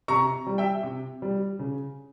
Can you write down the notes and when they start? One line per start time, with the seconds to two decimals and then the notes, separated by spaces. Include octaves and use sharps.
0.08 C3 A#5 C#6
0.47 G3
0.58 E5 G5
0.83 C3
1.22 G3
1.59 C#3